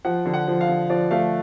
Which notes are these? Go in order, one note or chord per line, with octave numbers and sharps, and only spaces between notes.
F3 F#5
D3
F#5
F3
F5
D3
F3 D5
A3 F5